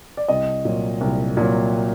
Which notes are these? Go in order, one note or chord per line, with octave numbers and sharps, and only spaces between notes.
D5
C2 D#5
A#2 F#3
C2
A#2 F#3